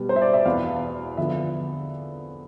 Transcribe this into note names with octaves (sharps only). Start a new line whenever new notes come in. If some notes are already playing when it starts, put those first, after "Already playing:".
Already playing: B2 G3 B3
C5
E5
D5
E5
E2 B2 B3 F5
D3 F3 B3 E5